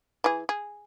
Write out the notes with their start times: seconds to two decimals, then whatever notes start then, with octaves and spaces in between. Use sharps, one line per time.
0.24 E3 G#4
0.49 G#4